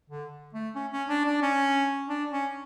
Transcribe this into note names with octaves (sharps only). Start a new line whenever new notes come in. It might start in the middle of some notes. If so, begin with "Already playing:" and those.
D3
A3
C#4
C#4
D4
D4
C#4
D4
C#4